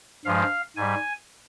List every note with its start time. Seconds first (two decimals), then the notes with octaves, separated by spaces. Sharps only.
0.25 G2 F3 G#3 F5
0.76 G#2 G3 G#5